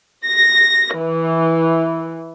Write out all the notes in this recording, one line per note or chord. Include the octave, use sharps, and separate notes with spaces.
A#6
E3